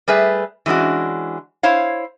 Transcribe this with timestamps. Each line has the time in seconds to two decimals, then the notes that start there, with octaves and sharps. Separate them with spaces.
0.08 G3 A3 G#4 B4 E5
0.66 E3 G#3 C#4 D4 F#4
1.63 E4 C5 C#5 F5